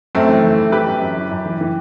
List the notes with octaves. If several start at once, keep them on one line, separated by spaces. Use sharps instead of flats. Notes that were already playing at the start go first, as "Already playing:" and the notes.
F#2 A3 C4
E3
E3
E3
E3 G4 B4
F#2
F#2
E3
F#2
E3
E3